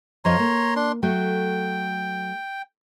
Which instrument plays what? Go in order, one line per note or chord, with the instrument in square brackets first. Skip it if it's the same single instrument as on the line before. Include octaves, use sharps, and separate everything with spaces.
[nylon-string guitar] F2 F3 D#5 [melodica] C#5 A#5 C6
[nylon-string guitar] A#3
[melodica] D4 C6
[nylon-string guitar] F#3 A3 [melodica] G5